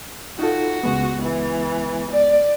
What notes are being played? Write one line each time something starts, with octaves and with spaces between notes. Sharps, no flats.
D#4 F4 F#4 A4
C#2 G#3 B3
E3
D5